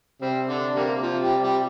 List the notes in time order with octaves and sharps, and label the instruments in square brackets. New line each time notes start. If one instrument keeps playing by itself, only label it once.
[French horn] C3 [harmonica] G3 C4
[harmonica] D3 D4
D3 G3 A#3
F3
G3
G3